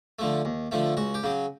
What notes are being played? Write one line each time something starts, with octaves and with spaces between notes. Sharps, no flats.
D3 F3 A3
D#2
D3 F3 A3
C#2 F#4
G4
C#3 F#3